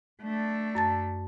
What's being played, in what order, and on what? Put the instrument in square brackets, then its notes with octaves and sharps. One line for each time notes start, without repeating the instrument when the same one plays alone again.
[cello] A3 D4
[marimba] F#2 A5 A6